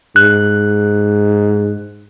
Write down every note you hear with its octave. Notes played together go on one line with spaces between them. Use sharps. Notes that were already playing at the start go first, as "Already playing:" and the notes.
G#2 F#6